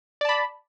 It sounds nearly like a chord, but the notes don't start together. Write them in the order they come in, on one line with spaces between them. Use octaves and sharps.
D5 A5 B5